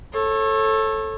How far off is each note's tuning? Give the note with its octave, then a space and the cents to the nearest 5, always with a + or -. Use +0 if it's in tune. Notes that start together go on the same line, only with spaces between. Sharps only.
A4 +0 C#5 -30